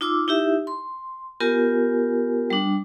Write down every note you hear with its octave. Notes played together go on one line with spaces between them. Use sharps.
D#4 F4 D6 E6
D#4 E4 G4 E5
C6
B3 F4 G4 A#4 G#5
G3 D4